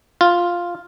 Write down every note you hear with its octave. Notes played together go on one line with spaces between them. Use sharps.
F4